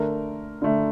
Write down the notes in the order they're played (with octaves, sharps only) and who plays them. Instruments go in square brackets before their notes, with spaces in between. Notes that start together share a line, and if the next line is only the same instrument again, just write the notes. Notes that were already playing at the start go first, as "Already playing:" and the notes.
Already playing: [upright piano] D3 A3 A#4
D3 A3